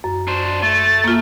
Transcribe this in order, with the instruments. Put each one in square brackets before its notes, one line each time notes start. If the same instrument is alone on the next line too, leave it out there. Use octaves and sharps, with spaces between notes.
[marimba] F#2
[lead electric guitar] D4 C5
[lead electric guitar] A3 [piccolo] A6
[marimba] A#3 F4